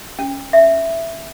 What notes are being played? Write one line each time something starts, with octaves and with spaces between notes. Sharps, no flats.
C#4
E5